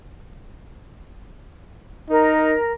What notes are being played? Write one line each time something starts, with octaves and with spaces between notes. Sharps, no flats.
D#4 A#4